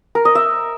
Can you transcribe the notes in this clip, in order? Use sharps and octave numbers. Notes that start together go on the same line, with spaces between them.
A#4
D#5
E5